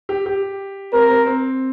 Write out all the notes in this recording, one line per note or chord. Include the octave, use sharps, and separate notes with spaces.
G4
G4
C4 A#4
C4
C4